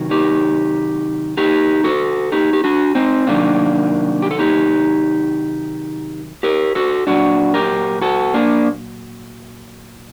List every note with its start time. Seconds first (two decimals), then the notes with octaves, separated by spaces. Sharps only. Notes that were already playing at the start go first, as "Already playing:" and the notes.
Already playing: C3 D#3 F#3
0.11 D#4 G4
1.37 D#4 G4
1.84 F#4 A4
2.32 D#4 G4
2.53 G4
2.64 D4 F#4
2.95 C4 D#4
3.27 C3 D#3 F#3 A#3 D4
4.22 G4
4.31 A4
4.39 D#4 G4
6.43 G4 A#4
6.75 F#4 A4
7.07 A#2 F#3 D4 F#4
7.54 G4 A#4
8.01 F#4 A4
8.34 A#3 D4